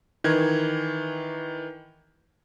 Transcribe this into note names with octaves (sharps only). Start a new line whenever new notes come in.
D#3 E3 G#6